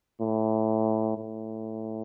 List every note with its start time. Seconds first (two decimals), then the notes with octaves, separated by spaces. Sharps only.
0.20 A2
1.17 A2